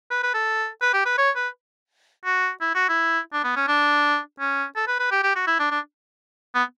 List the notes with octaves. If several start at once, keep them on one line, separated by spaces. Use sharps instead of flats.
B4
B4
A4
B4
G4
B4
C#5
B4
F#4
E4
F#4
E4
D4
B3
C#4
D4
C#4
A4
B4
B4
G4
G4
F#4
E4
D4
D4
B3